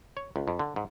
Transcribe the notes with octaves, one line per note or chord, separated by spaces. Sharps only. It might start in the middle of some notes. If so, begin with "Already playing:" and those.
C#5
C#2
F2
D3
G#2